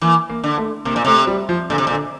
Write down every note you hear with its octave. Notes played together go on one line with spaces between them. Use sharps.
E3 A#3
A#3
D3
A3
C3 A#3
A#2
C3 A3
G3
F3
A#2 D3
C3
A#2
D3